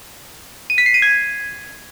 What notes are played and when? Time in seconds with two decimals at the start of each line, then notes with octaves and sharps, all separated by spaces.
0.70 D#7
0.78 B6
0.86 C7
0.94 D#7
1.02 G#6